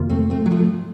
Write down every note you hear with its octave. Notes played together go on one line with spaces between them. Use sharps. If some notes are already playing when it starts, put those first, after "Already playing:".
Already playing: F2 C3 D#3 A#3 F4
A3 C4
A3 C4
F#3
F3 A3